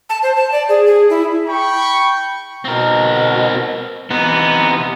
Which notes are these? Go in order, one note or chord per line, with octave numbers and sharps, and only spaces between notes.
A5
C5
A5
D5
G#4
G#4
E4
G5 B5 C#6
B2 C4 A#4
C3 E3 B3 D#4